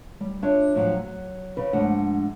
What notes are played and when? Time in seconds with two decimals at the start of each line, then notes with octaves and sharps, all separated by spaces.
0.20 G3
0.42 D4 F4 C#5 E5
0.75 A2 F3 F#3
1.05 F#3
1.57 C#3 B4
1.73 G#2 F3 A3 D4 F#5